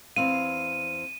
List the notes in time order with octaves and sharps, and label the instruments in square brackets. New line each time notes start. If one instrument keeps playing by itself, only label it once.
[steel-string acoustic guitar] E2 C4 F5 [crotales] D#7